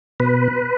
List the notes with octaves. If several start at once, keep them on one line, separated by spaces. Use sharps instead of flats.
B2 B4